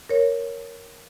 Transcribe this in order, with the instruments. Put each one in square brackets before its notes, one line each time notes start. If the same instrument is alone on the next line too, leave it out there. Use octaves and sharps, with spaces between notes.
[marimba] A#4 C#5